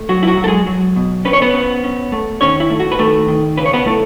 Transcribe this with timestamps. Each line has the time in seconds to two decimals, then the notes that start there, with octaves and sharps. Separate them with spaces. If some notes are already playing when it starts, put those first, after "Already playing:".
Already playing: A3
0.09 F#3 F#4
0.23 E4
0.28 F#4
0.37 F#3
0.44 A4
0.47 G#3 G#4
0.67 F#3
0.96 B2
1.25 C#4 B4
1.33 C#5
1.42 B3 B4
1.54 C#4
1.84 C#4
2.12 A3
2.41 D#3 C#4 C#5
2.60 E4
2.70 A3
2.80 F#4
2.92 B4
2.99 D#3 A3 A4
3.28 D#3
3.57 C#3 B4
3.66 C#5
3.73 B3 B4
3.86 A3 E4 A4